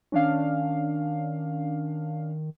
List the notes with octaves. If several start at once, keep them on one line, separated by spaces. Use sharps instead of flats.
D#3 C#4 D4 F5